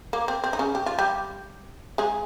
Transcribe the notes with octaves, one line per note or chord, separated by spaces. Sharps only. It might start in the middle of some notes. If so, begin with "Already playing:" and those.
A#3
C4
C4
D#4
C#3 C#4
G4
F4
G3 G4
G#3 G#4